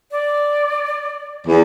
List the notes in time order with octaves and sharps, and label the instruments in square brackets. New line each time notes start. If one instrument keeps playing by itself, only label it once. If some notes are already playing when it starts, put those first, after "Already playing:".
[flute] D5
[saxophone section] E2